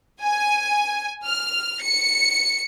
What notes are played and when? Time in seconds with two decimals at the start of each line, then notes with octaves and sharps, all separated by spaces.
0.21 G#5
1.25 F6
1.81 C#7